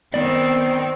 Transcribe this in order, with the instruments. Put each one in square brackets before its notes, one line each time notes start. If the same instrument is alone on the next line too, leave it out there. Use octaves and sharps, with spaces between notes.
[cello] D#3 C4 [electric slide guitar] B3 D5